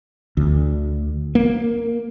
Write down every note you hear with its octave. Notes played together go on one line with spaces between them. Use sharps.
D2
A#3